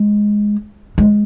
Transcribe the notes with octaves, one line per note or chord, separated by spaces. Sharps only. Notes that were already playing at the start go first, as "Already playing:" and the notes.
Already playing: G#3
G#3